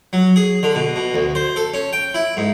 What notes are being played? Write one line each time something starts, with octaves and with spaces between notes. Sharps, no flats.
F#3
G#4
D3
B2
B2
D2
C5
A4
C#4
G5
E4
G#2